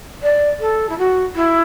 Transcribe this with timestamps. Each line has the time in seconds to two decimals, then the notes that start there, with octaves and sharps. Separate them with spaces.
0.22 D5
0.59 A4
0.89 E4
0.98 F#4
1.35 E4